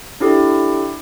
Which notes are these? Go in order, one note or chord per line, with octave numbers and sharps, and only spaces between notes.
D4 E4 G4 A4